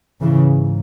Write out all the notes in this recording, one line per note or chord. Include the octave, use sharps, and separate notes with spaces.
G#2 C#3 E3